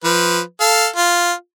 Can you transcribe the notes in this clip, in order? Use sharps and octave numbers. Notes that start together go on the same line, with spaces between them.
F3 B4
A4 F5
F4